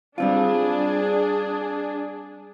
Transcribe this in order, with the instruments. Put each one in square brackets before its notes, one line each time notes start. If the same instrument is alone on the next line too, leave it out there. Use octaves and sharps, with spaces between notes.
[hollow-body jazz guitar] G3 C4 F4 [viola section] D4 G#4